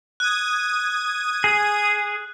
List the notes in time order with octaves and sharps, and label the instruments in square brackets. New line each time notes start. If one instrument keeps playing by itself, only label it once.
[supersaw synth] D#6 G#6 D#7 [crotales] F#6
[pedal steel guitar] G#4